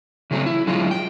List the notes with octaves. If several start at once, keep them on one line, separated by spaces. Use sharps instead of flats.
C#3 E3 F#3 A3 C4
E4
D3 F#3 G#3 E4 F4
G5